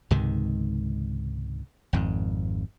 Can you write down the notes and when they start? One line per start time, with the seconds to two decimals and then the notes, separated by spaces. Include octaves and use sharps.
0.11 C#2 G#2 C3 D#3
1.93 G#1 F2 G#2